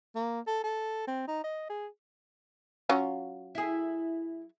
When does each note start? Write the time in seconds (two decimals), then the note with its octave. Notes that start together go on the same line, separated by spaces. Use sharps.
0.16 A#3
0.47 A4
0.64 A4
1.08 C4
1.28 D#4
1.44 D#5
1.69 G#4
2.89 F#3 C#4 F4
3.55 E4 G#4